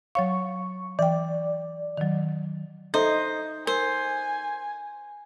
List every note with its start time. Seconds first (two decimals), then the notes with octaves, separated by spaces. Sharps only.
0.15 F#3 C#5 F5 C#6
0.99 E3 D5 G5
1.97 D#3 F#3
2.94 D#4 A4 C5 E5
3.67 A#4 C5 G#5